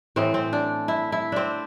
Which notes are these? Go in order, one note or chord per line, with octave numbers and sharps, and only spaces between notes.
A2 E3 C4
C4
D4
E4
E4
C4 D4